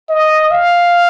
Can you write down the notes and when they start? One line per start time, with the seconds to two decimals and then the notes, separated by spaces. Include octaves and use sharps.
0.09 D#5
0.51 F5